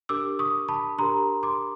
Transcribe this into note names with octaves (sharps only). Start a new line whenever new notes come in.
D4 G4 A#4 D6 E6
C#6 D#6
A5 B5
D4 G4 A#4 A#5 C6
C6 D6